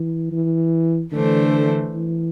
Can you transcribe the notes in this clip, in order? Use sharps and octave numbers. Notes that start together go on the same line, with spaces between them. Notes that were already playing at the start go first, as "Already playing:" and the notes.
Already playing: E3
E3
D3 E3 A3 D4 C5
E3